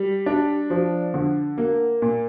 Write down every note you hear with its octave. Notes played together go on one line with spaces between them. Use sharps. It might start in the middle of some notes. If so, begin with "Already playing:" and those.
Already playing: G3
D4
F3
D3
A#3
A#2